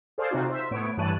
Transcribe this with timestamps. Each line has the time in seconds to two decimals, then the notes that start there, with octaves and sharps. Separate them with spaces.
0.18 G#4 A4 C5 D5 F5
0.31 C3 C4 D#4 F4 F#4
0.50 C5 E5
0.71 A2 B3 C#5 D7
0.97 G2 E3 C#5 A5 F#6 D#7